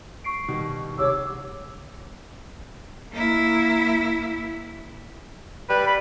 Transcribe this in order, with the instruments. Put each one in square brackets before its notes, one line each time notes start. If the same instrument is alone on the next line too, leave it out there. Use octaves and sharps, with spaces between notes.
[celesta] C#6 C7 D7
[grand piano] B2 D#3 G3
[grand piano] C2 [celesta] G4 G#4 [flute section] C#5 D6 E6
[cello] A#3 E4
[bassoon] G3 [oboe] B4
[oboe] B5